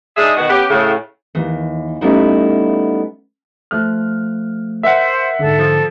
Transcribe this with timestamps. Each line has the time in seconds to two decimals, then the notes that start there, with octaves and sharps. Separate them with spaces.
0.16 G#3 D4 D#4 G#4 E5
0.37 B2 D#3 B3 F#4
0.49 B3 C#4 G4
0.70 A2 C#3
1.35 D#2 E3
2.01 G3 A3 B3 C#4 D#4 E4
3.71 F3 A3 F6 F#6
4.83 A#4 C5 E5 F#5
5.39 G#2 D3 A4
5.59 F3